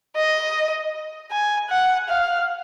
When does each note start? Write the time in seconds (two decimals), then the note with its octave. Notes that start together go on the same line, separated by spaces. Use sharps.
0.17 D#5
1.31 G#5
1.70 F#5
2.09 F5